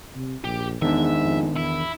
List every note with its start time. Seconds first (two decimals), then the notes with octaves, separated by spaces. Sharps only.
0.16 C3
0.45 A#1 G4
0.82 E2 G#2 D#3 B3 D4 E5
1.22 F2
1.56 E2 E4